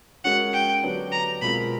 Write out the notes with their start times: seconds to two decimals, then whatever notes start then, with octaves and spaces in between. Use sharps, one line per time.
0.24 G#3 C#4 F#4 A#4 F#5
0.54 G5
0.82 D3 F#3 B3 D4 G4
1.12 A#5
1.42 B2 G#3 C4 F4 A#4 B5